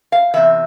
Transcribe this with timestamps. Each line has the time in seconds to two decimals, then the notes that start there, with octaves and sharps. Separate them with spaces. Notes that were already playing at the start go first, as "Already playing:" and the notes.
0.12 F5
0.34 E2 C3 E3 E5